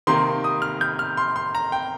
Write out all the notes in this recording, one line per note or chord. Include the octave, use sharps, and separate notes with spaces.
C3 D#3 A#3 C6
D#6
F6
G6
F6
C6
C6
A#5
G5